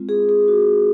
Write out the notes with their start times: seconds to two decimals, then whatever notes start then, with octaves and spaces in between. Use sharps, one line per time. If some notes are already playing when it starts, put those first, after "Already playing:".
Already playing: G#3 C4 F4
0.09 G#4
0.29 G#4
0.48 F#4